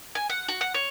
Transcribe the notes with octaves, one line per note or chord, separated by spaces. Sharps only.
G#5
F#5
F#4
F#5
C#5